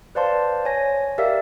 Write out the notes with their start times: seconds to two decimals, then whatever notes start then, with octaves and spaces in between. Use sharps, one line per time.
0.15 B4 C5 D5 F5 A5 C6
0.65 C#5 G#5 A#6
1.18 G4 A#4 D5 E5 F5 E6